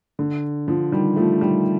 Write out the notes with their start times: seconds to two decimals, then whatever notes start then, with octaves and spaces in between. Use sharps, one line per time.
0.19 D3
0.68 D3 F3
0.92 D#3 G3
1.16 F3 A3
1.41 D#3 G3